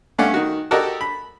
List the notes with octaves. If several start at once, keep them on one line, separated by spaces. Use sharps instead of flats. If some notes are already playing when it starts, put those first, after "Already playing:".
G2 A3 C#4 D5 F5 F#5
D#3 F#4
F#4 G4 A4 A#4 D5 D#5
B5